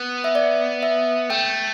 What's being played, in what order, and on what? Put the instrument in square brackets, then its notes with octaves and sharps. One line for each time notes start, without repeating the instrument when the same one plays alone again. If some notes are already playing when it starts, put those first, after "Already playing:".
Already playing: [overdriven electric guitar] B3
[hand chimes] E5
D5
E5
[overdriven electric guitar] A3 [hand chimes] G5